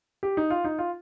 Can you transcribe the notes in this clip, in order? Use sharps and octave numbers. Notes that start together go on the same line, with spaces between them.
G4
D#4
F4
D#4
F4